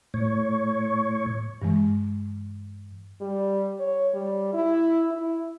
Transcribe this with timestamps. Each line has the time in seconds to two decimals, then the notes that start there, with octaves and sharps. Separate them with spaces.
0.14 A2 C#5
1.62 G2 E3 G#3
3.21 G3
3.79 C#5
4.14 G3
4.53 E4
5.11 E4